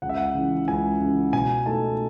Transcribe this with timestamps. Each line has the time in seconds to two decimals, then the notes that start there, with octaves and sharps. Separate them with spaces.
0.02 C#2 F#5
0.09 E5
0.17 F#5
0.34 C#3 E3
0.68 C#2 G#5
1.01 C#3 E3
1.33 B2 G#5
1.66 A3 D#4 A5